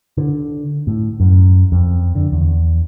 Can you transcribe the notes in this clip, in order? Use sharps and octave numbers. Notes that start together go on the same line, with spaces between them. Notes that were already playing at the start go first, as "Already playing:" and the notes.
D3
A2
F#2
F2
D3
E2